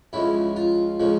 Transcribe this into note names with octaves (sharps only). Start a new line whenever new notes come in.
C#2 C#3 F3 G#3 E4
F4
C#3 F3 G#3